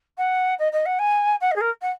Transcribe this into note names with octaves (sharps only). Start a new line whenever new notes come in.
F#5
D#5
D#5
F#5
G#5
F#5
D#5
G#4
A#4
F#5